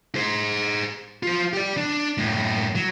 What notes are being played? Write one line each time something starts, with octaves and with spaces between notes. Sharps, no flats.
G#4 C5
F4 C5
G4 D5
D4
F#2 A2
F#3